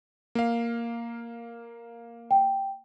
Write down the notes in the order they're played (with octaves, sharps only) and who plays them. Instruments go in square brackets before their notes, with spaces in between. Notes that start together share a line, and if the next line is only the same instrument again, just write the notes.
[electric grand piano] A#3 F5
[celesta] G5